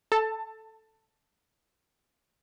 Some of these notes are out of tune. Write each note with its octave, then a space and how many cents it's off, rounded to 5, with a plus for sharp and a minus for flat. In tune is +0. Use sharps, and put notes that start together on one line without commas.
A4 -5 A5 +15